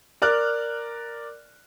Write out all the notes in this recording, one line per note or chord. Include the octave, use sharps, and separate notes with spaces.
A#4 D5 F6 F#6